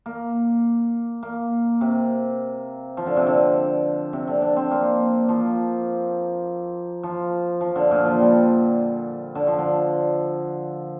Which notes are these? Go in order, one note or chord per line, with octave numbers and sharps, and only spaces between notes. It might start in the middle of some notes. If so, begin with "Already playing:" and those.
A#3
A#3
C3
F3
D3
C3
D3
C3
D3
D4
C4
A#3
F3
F3
F3
D3
A#2
F3
G3
D3
F3
D3